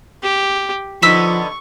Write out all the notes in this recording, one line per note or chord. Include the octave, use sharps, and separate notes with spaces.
G4
D3 F3 B3 D#4 C#6 E6 B6 E7